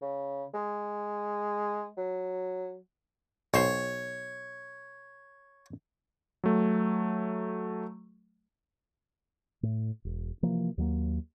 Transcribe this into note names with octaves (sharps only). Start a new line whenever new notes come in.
C#3
G#3
F#3
B1 C5 C#5
F#3 A3
A2
E1
C3 E3 F3 A#3
D#2 F#3 G#3 A#3